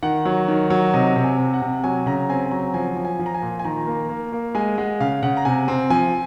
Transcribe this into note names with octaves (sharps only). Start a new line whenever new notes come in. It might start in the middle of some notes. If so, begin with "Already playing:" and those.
D#3 F#5
F#3
D#3
F#3
C3 D#5
C3
G#5
C3
F#5
C3
F#3 G#5
C#3 A#5
C4 G#5
G#5
F#3 A#5
F3 G#5
F3
G#5
F3
A#5
G#5
A#2
G#5
D#3 A#5
A#3
A#3
A#3
G#3 G#5
G#3 F#5
C#3 F5
C#3 F#5
A#5
C3 G#5
C4
F3 G#5